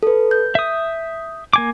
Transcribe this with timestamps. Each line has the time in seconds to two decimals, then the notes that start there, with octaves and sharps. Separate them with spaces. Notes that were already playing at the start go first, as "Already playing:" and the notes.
0.03 A4 B4
0.31 G6
0.55 E5 D#6
1.53 A#3 G#5 D6